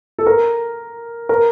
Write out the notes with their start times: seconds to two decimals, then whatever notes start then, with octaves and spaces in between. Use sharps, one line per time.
0.19 A4
0.27 A#4
1.29 A#4